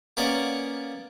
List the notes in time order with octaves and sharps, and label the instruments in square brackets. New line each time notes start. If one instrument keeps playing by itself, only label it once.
[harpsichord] A#3 B3 C#4 A#4 D5 D#5